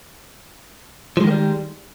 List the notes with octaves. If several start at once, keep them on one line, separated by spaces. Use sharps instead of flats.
D#3 F3 G3 G#3 A#3